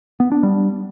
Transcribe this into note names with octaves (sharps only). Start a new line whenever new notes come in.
B3
D4
G3